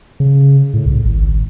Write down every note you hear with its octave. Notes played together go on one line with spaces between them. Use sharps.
C#3
A2
C2
G#1